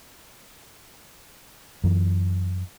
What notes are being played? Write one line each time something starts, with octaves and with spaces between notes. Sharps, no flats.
F#2 E3